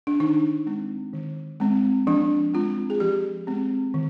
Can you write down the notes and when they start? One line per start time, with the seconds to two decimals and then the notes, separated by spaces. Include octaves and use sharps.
0.07 D4
0.20 D#3 D#4
0.66 G#3 C4
1.14 D#3
1.60 G#3 C4
2.07 F3 D4
2.54 G#3 C4 F4
2.90 G#4
3.00 F3 G4
3.47 G#3 C4
3.94 D#3